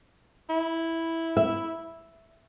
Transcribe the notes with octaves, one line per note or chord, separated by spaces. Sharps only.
E4
E5